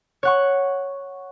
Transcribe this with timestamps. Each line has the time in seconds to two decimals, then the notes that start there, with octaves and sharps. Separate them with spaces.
0.23 C#5 F#5 C#6